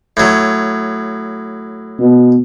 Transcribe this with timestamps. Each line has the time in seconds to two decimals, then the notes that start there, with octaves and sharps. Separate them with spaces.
0.17 A2 F#3
2.00 B2